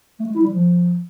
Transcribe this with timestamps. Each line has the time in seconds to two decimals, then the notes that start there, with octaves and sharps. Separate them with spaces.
0.20 A3
0.27 G#3
0.35 E4
0.42 G3
0.50 F3